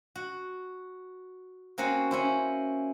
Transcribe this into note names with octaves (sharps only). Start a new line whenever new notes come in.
F#4
A#3 C4 C#4 F#4
C#4 E4 C5